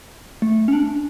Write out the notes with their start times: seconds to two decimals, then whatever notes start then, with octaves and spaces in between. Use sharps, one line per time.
0.42 A3
0.68 C#4
0.73 D4